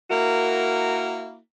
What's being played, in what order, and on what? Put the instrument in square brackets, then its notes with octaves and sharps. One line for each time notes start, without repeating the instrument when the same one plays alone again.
[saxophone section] A#3 E4 F#4 A#4